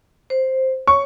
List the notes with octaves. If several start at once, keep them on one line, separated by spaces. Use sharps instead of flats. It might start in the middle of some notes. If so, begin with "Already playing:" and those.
C5
C#5 C#6